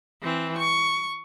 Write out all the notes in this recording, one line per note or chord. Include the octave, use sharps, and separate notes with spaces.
E3 C4
C#6